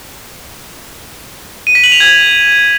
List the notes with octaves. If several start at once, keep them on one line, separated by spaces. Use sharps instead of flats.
D#7
B6
F#7
F7
G#6